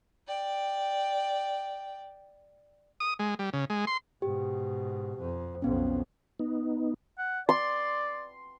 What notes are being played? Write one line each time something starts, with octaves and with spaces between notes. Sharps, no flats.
D5 G5
D#6
G#3
G3
C#3
G#3
C6
G#2 B2 G4
F2
B1 F2 B3 C#4
B3 D#4
F#5
D5 C6